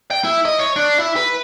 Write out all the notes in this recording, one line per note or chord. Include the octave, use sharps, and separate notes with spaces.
G5
E4
D#5
C#5
D4
E4
B4